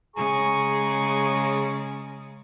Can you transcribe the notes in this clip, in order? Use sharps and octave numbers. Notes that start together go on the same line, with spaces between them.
C#3 G#3 G#4 A#5 C#6